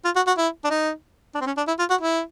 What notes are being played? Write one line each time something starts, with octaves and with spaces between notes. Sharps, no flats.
F4
F#4
F#4
E4
D4
D#4
D4
C4
C#4
D4
E4
F4
F#4
E4